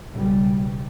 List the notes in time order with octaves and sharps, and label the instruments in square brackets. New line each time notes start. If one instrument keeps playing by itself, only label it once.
[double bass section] B1 C#3 G3